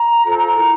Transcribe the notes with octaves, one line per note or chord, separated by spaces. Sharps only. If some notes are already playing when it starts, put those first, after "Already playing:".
Already playing: A#5
F4 A4 C5
E4 A#4 A#5